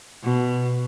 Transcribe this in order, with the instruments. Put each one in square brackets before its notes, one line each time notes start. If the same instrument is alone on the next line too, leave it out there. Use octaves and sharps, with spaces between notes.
[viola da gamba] B2